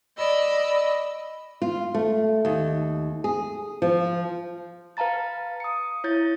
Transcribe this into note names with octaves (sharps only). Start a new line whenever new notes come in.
D5 D#5 B5 E6
F4
A3
D#2
G#4
F3
B4 F5 A5 A#5 A6
D#6 C#7
E4 C#5 G6 A6